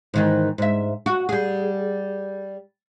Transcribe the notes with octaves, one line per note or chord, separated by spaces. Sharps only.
G#2 D#3 E3
G#2 E5
F#4
G3 G#4